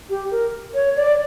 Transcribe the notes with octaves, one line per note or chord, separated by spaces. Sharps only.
G4
A#4
C#5
D5